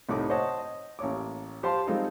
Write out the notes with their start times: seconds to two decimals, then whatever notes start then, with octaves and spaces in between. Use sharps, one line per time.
0.09 C2 A2 D#4 D6
0.30 C5 C#5 D#5 F#5 A5
0.58 D#5
0.99 A1 A#3 C#5 D6
1.63 G4 C5 F5 A5 C6
1.87 G3 G#3 C4 D#4 F4 A4